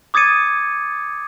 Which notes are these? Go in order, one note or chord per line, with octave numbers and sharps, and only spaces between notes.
D6 D#6 G#6 A6 C#7 D#7